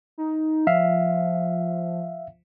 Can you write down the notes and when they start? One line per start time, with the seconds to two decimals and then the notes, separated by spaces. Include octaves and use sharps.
0.18 D#4
0.67 F3 E5 F5